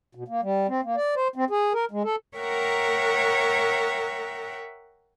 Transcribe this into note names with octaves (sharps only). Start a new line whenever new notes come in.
B2
A#3
G3
C4
A#3
D5
C5
C4
G#4
A#4
G#3
A4
A#4 C#5 E5 F#5 G5 A#5